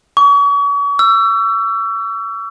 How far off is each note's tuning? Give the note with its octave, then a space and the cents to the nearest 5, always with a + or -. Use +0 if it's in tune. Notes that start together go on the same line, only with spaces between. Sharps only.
C#6 +40
E6 +30